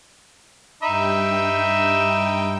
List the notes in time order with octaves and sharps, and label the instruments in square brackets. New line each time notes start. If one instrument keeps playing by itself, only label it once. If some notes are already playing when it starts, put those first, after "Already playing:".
[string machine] G2 G5 [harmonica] D#4 E5 B5